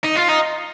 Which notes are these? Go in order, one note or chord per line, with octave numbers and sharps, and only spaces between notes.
D#4
F4
D#4